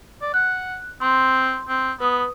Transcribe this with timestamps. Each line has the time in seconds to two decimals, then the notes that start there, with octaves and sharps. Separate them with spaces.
0.22 D5
0.34 F#5 F#6
1.01 C4 C6
1.69 C4
2.00 B3 B4 D#6